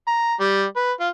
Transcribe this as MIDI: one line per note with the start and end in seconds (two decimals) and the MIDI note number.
0.07 0.34 82
0.40 0.63 55
0.76 0.91 71
1.00 1.08 65